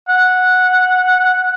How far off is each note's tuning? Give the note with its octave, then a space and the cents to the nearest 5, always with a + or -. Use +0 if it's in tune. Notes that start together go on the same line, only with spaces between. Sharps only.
F#5 -10